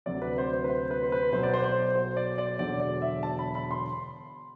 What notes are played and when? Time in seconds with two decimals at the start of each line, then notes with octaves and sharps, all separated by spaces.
0.06 D2 C3 F#3 D5
0.22 B4
0.38 C5
0.53 C5
0.64 B4
0.70 C5
0.91 B4
1.03 C5
1.12 B4
1.32 B1 B2 F#3 C5
1.43 D5
1.54 C5
1.64 C5
1.96 C5
2.17 D5
2.38 D5
2.59 E1 E2 D3 F#3 D5
2.80 D5
3.02 E5
3.23 A5
3.39 B5
3.55 B5
3.71 C6